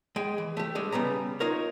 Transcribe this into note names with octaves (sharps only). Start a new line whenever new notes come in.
G#3 G5
E3
A3 G4
D3 G3 G#3
C#3 G3 B3 A#5
D#4 F4 A#4 C#5